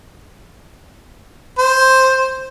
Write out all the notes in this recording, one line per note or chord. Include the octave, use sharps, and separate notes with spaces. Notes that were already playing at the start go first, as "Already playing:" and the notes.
C5